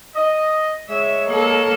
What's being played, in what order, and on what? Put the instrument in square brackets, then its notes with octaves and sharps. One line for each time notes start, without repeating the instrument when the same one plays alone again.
[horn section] D#5
[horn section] G#3 C#5 [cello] E5
[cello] A#3 A4